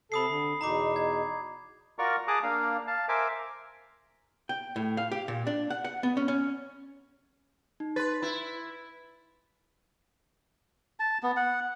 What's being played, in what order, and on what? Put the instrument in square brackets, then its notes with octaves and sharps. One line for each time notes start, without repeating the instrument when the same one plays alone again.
[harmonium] C3 A4 [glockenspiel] B5 D#6 C7
[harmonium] D3
[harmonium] E2 B2 D#4 [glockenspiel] A#5 B5 D6
[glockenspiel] G#6
[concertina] F4 F#4 A#4 D5 A#5 C#6
G#4 A5 A#5 D6 D#6 F#6
A#3 D4 F5
F5 A5
A#4 C5 E5 G#5 D6
[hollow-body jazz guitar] G5
A2
F5
G4
A#2
D4
F#5
F#5
B3
C#4
C#4
[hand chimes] D#4
[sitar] B4 [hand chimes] C6 A6
[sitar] E4
[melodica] A5
B3
F#5